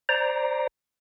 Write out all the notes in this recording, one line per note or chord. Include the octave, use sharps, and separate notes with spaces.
C5 D5 A#5